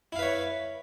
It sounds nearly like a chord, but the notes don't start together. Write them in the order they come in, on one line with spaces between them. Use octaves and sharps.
E4 F5 B4 C#5